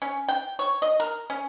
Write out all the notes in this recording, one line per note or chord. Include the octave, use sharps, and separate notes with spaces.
C#4
G5
C#5
D#5
A#4
C#4